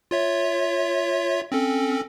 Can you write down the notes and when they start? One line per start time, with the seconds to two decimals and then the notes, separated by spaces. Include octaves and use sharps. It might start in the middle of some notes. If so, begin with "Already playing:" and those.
0.11 F4 C#5 E5
1.52 C4 C#4 A4